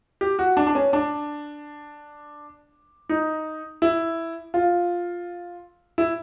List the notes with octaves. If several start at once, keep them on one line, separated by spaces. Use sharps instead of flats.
G4
F#4
D4
D4
C#4
D4
D#4
E4
F4
E4